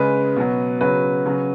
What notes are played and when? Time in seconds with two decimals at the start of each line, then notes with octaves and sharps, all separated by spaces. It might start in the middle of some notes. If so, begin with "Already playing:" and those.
Already playing: C#3 G#3 B4
0.36 B2 F#3
0.81 C#3 F#3 B4
1.26 C#3 F#3